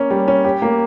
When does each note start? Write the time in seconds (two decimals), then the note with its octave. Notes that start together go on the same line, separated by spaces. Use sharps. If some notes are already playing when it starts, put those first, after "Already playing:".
Already playing: A#3 C#4
0.10 G3
0.28 C#4
0.45 G4
0.62 A#3